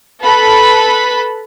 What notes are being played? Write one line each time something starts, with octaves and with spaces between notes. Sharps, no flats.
A4 B4 B5